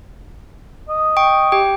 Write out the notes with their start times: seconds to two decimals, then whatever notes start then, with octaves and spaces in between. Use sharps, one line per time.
0.89 D#5
1.17 G5 C#6
1.52 G4 G5